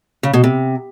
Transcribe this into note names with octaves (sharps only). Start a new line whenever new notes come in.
C#3
B2
C3